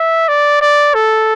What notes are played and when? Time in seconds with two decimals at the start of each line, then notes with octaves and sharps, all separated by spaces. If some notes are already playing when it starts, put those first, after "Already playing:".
Already playing: E5
0.28 D5
0.62 D5
0.95 A4